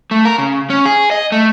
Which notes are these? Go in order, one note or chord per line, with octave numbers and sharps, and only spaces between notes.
A3
A#4
C#3
C#4
G#4
D#5
A3